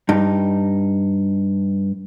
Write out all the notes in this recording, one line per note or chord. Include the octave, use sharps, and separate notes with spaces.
G2 D#4